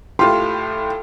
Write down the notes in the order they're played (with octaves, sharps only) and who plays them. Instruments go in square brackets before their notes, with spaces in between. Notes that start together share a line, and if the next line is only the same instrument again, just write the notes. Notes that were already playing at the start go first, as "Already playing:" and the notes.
[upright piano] A2 F4 G4 [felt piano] C6